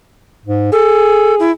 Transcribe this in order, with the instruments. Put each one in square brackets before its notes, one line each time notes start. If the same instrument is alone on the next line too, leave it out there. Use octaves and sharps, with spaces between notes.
[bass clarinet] G#2
[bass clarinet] G#4 [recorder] A4
[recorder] E4